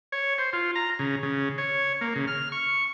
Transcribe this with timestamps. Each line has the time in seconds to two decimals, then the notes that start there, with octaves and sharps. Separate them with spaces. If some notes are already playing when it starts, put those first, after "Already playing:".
0.12 C#5
0.38 C5
0.53 F4
0.75 A#5
0.99 C#3
1.23 C#3
1.58 C#5
2.01 A#3
2.16 C#3
2.28 F6
2.52 C#6